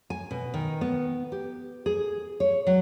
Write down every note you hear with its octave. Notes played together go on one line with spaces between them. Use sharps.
G#5
B2
D#3
B3
G4
G#4
C#5
F#3